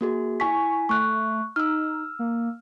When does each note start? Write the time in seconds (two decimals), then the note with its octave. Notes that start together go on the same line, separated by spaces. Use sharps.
0.01 A#3 F#4 G#4
0.40 E4 G#5 C#6 B6
0.89 A3 C#6 F#6
1.56 D#4 E6 F6
2.19 A#3